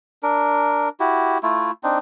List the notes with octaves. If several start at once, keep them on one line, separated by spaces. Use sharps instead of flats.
D4 A#4
E4 F#4 G4
A3 E4 F4
C4 D4 D#4